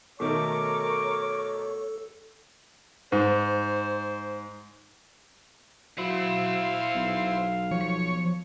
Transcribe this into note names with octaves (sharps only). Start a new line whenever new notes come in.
B2 D#3 A3 A4 A#4 C#5 C#6 D6
G#2 C5
F#3 E4 C5 F5 B5
B1
F3 C#5